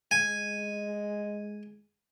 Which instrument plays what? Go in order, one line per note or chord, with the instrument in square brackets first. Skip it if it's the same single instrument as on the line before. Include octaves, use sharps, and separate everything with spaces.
[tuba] G#3 [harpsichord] G#5